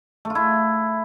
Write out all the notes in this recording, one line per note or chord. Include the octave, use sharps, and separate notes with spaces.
A3
F4
E4